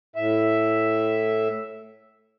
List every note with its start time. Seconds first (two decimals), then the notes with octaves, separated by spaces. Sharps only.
0.16 A2 E5